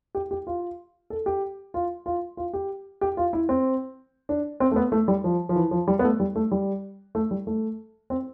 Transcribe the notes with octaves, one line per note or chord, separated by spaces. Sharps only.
G4
G4
F4
A4
G4
F4
F4
F4
G4
G4
F4
E4
C4
D4
C4
A3
B3
A3
G3
F3
F3
E3
F3
G3
B3
A3
G3
A3
G3
A3
G3
A3
C4